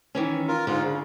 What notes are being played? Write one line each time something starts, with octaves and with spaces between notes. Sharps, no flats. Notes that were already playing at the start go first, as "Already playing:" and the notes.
D#3 E3 C#4
F4 A#4
G#2 D3 F4
C#3